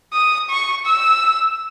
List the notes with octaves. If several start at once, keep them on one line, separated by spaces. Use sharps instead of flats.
D#6
C#6
E6